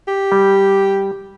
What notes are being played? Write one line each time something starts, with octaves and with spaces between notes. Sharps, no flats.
G4
G3